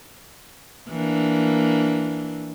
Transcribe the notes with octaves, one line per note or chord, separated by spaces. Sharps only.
E3 A#3 D4